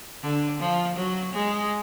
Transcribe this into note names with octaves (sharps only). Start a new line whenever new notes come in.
D3
F3
F#3
G#3